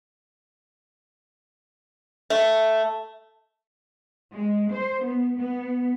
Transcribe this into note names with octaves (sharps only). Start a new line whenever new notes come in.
A3
G#3
C5
B3
B3